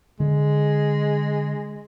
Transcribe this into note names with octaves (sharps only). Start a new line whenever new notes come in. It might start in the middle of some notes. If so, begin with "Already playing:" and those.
D3 G#3